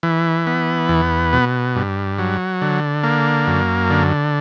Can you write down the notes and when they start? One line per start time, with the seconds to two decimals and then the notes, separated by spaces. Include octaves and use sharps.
0.03 E3
0.47 B3
0.89 E2
1.33 B2
1.76 G2
2.18 F#3
2.62 D3
3.03 A#3
3.47 F#2
3.90 D3